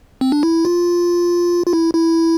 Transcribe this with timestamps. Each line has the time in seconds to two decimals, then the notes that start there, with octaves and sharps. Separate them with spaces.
0.21 C4
0.32 D4
0.43 E4
0.65 F4
1.67 F4
1.73 E4
1.94 E4